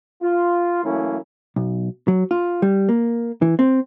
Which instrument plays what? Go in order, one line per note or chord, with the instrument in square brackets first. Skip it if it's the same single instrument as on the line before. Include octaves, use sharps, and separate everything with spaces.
[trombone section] F4
E3 F#3 A3 A#3 C#4 E4
[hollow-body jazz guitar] B1
F#3
F4
G3
A#3
E3
C4